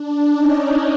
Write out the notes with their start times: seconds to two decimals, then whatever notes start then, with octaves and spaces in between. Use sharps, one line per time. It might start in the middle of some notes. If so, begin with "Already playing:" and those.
Already playing: D4
0.34 C#4 D#4